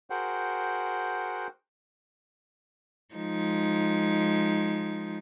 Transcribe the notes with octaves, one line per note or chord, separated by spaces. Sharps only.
F#4 G#4 A#4 C5 F#5 G5
F3 G#3 D#4